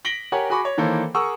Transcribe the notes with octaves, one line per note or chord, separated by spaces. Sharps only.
A#6 B6 D7 F#7 G7
G4 A#4 C#5 F#5 G#5
F#4 G#4 G#5 B5 C#6 D6
C#5
D#3 E3 A#3 A4 C5 C#5
G#4 A#4 F#5 C#6 D#6 E6